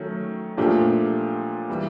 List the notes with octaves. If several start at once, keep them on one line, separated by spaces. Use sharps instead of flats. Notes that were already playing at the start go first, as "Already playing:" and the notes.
Already playing: D#3 F#3 A3 C#4
A#2 F3 A3 D4 G4
E3 G3